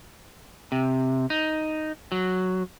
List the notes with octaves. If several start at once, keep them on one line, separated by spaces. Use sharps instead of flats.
C3
D#4
F#3